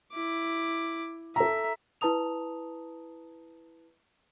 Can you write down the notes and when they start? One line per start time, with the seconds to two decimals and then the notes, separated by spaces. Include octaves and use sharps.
0.13 E4 D6
1.36 A4 E5 A#5
2.01 E4 B4 A5 A#5 D#6 F7